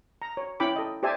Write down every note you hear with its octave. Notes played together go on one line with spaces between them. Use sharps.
A#5
C#5
C#4 E4 G5 B5 D6
A4 D#5
G4 C5 D5 E5 G#5 A5